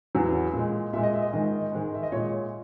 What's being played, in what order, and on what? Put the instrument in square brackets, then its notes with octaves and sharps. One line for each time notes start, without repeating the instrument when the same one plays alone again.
[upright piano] E2 C#3 F#3
A#2 G#3
A#2 G#3 E5
D#5
E5
D#5
G#2 D#3 G#3 D#5
G#2 D#3 G#3
E5
D#5
A#2 G#3 C#5